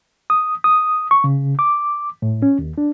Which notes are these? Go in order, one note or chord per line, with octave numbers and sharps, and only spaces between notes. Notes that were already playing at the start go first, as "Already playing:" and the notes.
D#6
D#6
C#6
C#3
D6
A2
C#4
D#2
D4